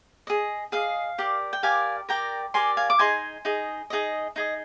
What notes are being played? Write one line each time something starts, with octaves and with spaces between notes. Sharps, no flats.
G#4 D#5
G#4 D#5 F5
G4 A#4 D5
G5
G4 A#4 D5 F5 G#5
G4 A#4 D5 G5 A#5
G4 A#4 D5 G#5 C6
F5 G#5
D6
D#4 G#4 D#5 G#5 C6
D#4 G#4 D#5
D#4 G#4 D#5
D#4 G#4 D#5